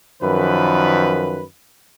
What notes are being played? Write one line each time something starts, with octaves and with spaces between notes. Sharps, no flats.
F#2 D#3 F3 B4